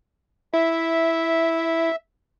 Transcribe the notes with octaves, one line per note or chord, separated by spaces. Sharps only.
E4 E5